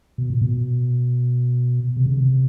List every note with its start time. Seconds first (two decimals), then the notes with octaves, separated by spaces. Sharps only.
0.18 B2
0.30 A#2
0.41 B2
1.97 C3
2.06 C#3
2.17 C3